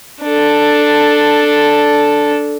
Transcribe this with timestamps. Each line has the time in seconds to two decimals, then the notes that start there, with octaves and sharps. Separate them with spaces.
0.23 D4 A4